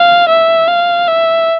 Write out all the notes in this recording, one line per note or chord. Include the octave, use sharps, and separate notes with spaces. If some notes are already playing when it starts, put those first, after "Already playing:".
Already playing: F5
E5
F5
E5